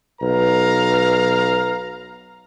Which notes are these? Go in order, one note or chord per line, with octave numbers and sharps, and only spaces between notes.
B1 B4 F5 A#5